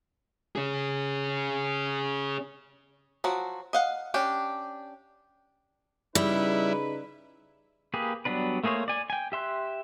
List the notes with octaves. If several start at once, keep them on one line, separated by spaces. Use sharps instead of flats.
C#4 G#4
F3 F#3 F#4
D#5 F5 F#5
C#4 D4 G4
C#3 G3 D#4 E4 B4
A#3 G4 G#4 B4
F#3 G3 B3 D4 B4
A3 A#3 G#4 C5 C#5
D5 G#5
G5 G#5
G4 E5 C6 F#6